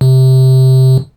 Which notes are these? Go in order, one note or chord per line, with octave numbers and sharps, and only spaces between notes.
C3